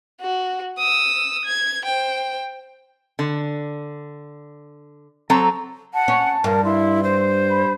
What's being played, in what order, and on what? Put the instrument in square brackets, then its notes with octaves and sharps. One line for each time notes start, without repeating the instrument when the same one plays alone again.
[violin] F#4
D#6 E6
G#6
C5 G5
[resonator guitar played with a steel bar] D3
F#3 C4 A4 A#5
[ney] F#5 [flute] A5
[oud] C#4
[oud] G2 [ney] A#4
[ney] E4 [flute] C6
[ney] C5
[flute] B5